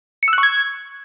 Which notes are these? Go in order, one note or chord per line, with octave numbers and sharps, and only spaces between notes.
C#7
E6
F#6
C#6
G#6